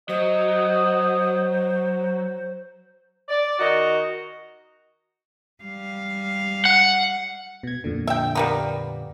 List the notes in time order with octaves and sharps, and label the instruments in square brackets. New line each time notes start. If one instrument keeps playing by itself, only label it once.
[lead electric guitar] F#3 [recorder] C5 [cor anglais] D#5
[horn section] D5
D#3 F#4 D#5 A#5
[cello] G3 F5
[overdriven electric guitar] F#5
[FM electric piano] B2 G#6
F2 A#2 D3
[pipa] E5 G5
G3 A#3 B3